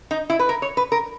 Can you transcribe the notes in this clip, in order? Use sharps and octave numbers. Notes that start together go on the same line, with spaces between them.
D#4
E4
B4
A#4
C#5
B4
A#4